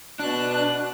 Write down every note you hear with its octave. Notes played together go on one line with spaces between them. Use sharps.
B2 D4 F#6